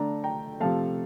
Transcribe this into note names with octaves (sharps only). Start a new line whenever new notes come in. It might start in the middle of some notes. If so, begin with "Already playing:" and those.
Already playing: D3 A3 D4 A#5
G5 A#5
C3 F3 A3 F5 A5